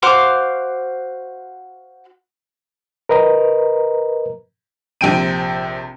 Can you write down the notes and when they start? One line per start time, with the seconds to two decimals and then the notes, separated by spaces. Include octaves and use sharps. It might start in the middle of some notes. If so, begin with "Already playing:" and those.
0.03 F#4 C5 F5 D6
3.09 A#4 B4 D#5 A#5
5.01 A#1 C3 G5 D7 D#7